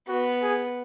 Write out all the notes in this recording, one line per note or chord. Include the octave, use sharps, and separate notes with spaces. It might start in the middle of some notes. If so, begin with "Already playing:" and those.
B3 F#4
G#4